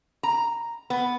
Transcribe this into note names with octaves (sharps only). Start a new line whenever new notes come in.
A#5
B3